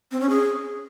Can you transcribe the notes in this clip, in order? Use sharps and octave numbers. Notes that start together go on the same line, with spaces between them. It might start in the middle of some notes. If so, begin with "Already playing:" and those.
C4
C#4
G#4